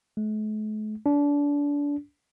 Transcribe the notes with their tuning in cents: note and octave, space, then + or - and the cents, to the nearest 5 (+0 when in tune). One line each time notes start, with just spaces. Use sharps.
A3 -45
D4 -30